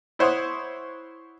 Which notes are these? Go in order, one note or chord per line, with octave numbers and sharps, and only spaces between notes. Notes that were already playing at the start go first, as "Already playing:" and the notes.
E4 C5 C#5 F#5 D#6